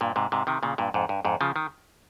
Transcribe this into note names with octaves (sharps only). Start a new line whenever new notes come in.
G2 A#2
G#2 C3
G#2 C3
C3 D#3
A#2 C#3
G2 A#2
F2 G#2
G2
F2 G#2
C#3 F3
D#3